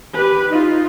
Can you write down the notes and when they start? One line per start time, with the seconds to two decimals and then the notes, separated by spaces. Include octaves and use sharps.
0.13 G4 B4
0.49 D#4 F4